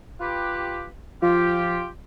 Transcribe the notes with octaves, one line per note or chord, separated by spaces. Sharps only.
F4 G4 B4
F3 F4 G4